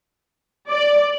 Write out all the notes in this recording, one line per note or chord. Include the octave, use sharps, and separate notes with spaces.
D5